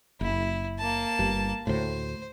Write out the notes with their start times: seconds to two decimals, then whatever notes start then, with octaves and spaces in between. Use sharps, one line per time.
0.21 F#1 E4
0.79 A#3 A5
1.19 G1 G2
1.67 D2 A2 C5